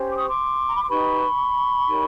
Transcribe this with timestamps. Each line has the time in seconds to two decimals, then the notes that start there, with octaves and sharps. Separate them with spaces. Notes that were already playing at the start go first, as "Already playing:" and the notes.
Already playing: C#4 G4 C5
0.10 D6
0.15 C#6 D#6
0.27 C6 D6
0.67 A#5
0.75 B5
0.82 C6
0.89 D#4 G4 B4 B5 C#6
1.88 D#4 G4 A#4 C#5